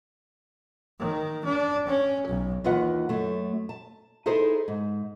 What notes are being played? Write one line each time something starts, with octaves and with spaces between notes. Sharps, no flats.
D#3
D4
C#4
B1
D#2 D#3 E3 F4 B4 F#5
F#2 A3
A5
D#4 E4 G#4 A4 B4 C5
G#2